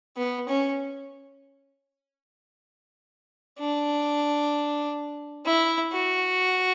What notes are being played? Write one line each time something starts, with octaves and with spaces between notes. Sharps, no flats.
B3
C#4
D4
E4
F#4